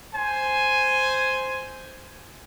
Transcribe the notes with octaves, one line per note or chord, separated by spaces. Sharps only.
C5 G#5